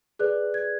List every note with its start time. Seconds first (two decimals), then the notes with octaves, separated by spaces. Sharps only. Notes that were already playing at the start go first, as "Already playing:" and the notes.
0.19 G#4 B4 D5 F#6
0.54 G#6